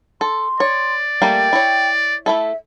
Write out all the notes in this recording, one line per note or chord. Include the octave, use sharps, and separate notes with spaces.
A4 C6
C#5 D5
G3 A3 A#3 G5
E4 C#5
A3 E4 A4 E5